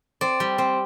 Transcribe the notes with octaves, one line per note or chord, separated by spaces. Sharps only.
C4 D5
G3
C4